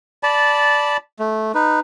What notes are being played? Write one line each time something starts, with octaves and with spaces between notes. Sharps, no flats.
D5 A5 B5
A3
D#4 B4